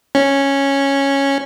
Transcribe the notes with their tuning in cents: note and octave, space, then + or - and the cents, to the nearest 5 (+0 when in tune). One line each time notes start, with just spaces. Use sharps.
C#4 -5